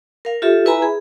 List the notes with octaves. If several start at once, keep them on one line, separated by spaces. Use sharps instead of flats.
A#4 F5
F4 G4 A4 E5
E4 B4 E5 G#5 A#5 B5
G#4